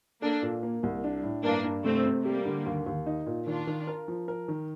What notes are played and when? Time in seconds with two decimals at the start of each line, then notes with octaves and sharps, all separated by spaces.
0.22 A#3 D4 A4
0.42 A#2
0.63 A#3
0.83 C2
1.04 D4
1.24 A2
1.44 G2 A#3 D4
1.64 G2
1.84 C3 A3 C4
2.06 C3
2.25 G3 A#3 G4
2.45 D3
2.66 D#2
2.87 D#2
3.06 D#4
3.26 A#2
3.47 D#3 D4 F4
3.67 D#3
3.87 A#4
4.08 F3
4.28 A#4
4.48 D#3